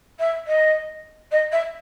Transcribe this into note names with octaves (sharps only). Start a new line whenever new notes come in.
E5
D#5
D#5
E5